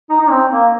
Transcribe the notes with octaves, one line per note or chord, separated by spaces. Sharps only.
D#4
D#4
C4
A#3